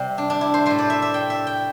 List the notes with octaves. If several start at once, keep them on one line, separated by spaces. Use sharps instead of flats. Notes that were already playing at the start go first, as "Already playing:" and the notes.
Already playing: C3 G3 C4
D4
D4
E4
C5
A2 A3 C5
D5
E5
E5
G5
E5
G5